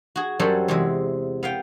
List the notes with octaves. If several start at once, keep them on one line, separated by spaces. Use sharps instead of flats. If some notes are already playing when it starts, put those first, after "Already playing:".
F#4 G#4
F#2 F#3 G3 A4 C5 C#5
E2 C3 G#3
B3 F5 G5